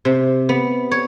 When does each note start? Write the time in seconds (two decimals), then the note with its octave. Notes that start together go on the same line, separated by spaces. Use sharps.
0.05 C3
0.49 B3
0.91 C#5